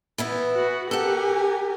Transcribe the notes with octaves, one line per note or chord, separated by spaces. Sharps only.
E3 B3 E4
F#4
G4 A4 A#4 F#5 G#5